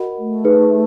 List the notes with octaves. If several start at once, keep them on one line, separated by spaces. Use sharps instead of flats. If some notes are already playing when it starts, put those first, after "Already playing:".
Already playing: F#4 A#4 D#5 F#5 B5
A3
D#4 G#4 B4